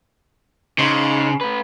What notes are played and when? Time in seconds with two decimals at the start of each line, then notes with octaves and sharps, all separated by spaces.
0.79 C#3 D#4 C5
1.41 A3 B4